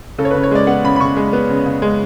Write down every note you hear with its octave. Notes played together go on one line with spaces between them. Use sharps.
C#3 A4
C#5
B4
C#3
C#5
G#3 D5
B3 F#5
C#3 B5
B5
C#3 C#6
G#3
B3
C#3
C#3
G#3